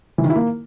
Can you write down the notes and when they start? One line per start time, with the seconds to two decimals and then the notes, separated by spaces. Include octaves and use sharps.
0.18 E3
0.24 D#3
0.30 E4
0.36 A#3